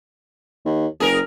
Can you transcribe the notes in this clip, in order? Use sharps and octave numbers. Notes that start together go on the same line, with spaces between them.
D#2
F#1 G#4 A#4